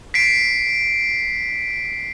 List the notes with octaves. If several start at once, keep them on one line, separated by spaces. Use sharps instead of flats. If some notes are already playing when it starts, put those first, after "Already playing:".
B6 C7 D7